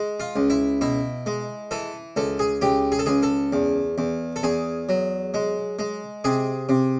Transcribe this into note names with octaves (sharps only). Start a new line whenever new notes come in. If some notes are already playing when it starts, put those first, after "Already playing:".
Already playing: G#3
F4
C#2
E4
B2 E4
G#3
E3 A4
C#2 A4
G#4
C#2 G4
G#4
A4
C#2 G#4
A4
E2
E2
A4
E2 G#4
F#3
G#3
G#3
C3 G#4
C3